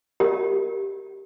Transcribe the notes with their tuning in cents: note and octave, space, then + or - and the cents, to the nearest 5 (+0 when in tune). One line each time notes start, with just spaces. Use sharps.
G4 -5 A#4 -10